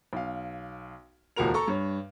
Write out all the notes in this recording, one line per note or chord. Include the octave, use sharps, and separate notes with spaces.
B1 F5
D#1 C#2 A#2 F#4 A#4 F7
A4 A#5 C#6
G2 C#5